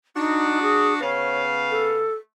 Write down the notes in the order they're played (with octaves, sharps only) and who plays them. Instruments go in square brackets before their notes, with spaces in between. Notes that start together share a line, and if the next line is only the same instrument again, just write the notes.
[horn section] D4 F#4 [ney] D#4
[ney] G#4
[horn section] C#3 B3 F5 [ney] C#5
[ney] A4